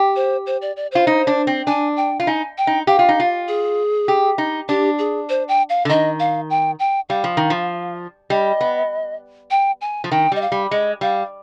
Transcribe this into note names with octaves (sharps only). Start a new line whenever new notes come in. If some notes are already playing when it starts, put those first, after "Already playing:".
Already playing: G4
C5
C5
D5
D5
F4 C5
D#4
D4
C4
D4 G#5
G5
F4
D#4 G#5
G5
D#4
G4 F5
F4
D#4
F4
G#4
G4
D#4
D4 G4
G#4
C5
G5
F5
D3
D#3 D#5
F5
G5
G5
G3 F5
F3
D#3
F3
G3 D#5
B3
G5
G#5
F3
D#3 G5
G3 D#5
F5
G3
G#3 D#5
G3 F5